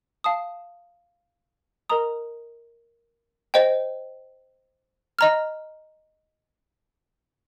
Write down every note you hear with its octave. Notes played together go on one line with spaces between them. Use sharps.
F5 A5 D#6
A#4 D#5 A#5 D#6
C5 D#5 G5
D#5 A#5 F6